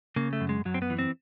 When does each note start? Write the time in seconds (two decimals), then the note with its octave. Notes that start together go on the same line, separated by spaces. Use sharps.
0.16 C#3 A#3
0.33 A3
0.41 F#2
0.49 G#3
0.65 F#2 F#3
0.74 C4
0.82 B3
0.90 E3
0.99 C4